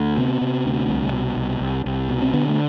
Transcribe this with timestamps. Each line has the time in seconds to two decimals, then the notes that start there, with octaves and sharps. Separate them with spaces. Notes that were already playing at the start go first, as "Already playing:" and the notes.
Already playing: D2
0.17 C3 B3
0.41 C3
0.66 D2
0.89 C2
1.13 B2
1.36 C2
1.60 C2
1.86 C2
2.09 B2
2.22 C4
2.33 D3 B3
2.48 A3